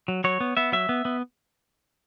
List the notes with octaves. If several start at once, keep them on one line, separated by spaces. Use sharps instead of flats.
F#3
F#3 C#5
B3
B3 E5
F#3 E5
B3
B3